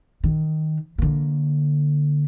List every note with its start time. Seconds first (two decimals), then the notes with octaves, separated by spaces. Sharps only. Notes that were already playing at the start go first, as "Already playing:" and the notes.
0.24 D#3
0.98 D3 A#3